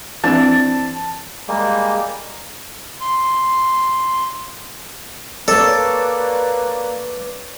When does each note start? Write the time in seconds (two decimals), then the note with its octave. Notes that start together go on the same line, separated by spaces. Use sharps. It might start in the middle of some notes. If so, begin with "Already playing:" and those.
0.24 E3 C4 D4 A5
1.48 G3 G#3 A#3
3.01 C6
5.48 A#3 A4 B4 C#5 D5